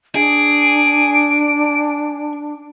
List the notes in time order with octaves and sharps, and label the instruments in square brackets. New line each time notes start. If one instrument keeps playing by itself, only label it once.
[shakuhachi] D4 [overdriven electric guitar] G#4 [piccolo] D7